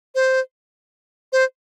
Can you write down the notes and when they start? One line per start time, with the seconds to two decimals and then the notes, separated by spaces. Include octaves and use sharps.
0.15 C5
1.33 C5